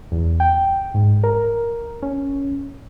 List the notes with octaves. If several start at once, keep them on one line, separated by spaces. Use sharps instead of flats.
E2
G5
G#2
A#4
C#4